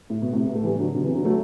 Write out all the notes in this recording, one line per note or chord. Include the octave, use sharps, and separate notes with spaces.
A2
B2
A2 C3
B3
A3
E3 G3
D3 F#3
B2 D3
C3 E3
D3 F#3
F#3 A3